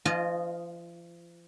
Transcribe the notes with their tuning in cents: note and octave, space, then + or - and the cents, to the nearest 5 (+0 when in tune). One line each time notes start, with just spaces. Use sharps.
F3 -35 F4 +0 D#5 -15